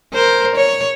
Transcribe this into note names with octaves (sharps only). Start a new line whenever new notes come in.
A#4 C5
C#5